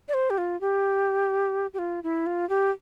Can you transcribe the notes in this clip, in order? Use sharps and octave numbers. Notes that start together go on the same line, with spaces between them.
D5
C5
G4
F4
G4
G4
F4
E4
F4
G4